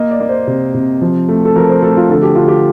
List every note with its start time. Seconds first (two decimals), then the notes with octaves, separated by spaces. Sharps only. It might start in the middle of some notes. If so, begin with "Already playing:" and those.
Already playing: A#3 D#5
0.11 D5
0.20 A#3
0.29 C5
0.47 C3
0.74 C3
1.02 F3
1.29 A3
1.45 A4
1.56 F3 A#4
1.69 C5
1.82 A3 A4
1.97 F4
2.09 D3 A4
2.22 G4
2.35 D3 F4
2.48 G4